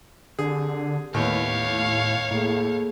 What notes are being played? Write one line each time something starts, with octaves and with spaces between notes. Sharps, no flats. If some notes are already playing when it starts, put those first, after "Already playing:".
D3 C4 G4 G#4
D#2 A2 B3 C#5 F5
A2 A#3 G#4 A4